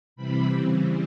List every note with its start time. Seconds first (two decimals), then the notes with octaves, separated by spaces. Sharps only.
0.16 C3 E3 G3 C4 B5
0.51 C#3 E3 G3 C4